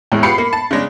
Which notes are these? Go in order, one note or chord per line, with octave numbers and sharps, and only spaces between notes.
E2 A2 G#3
B3 F4 G4 B5 C7 C#7
A#3
A5
C#3 G#3 D4